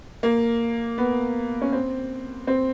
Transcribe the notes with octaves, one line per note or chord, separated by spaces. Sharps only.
A#3
B3
C#4
C4
C4